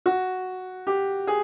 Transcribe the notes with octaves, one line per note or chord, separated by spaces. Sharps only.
F#4
G4
G#4